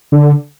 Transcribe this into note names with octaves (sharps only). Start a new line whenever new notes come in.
D3